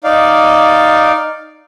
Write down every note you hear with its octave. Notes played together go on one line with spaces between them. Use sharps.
D#4 D5 F5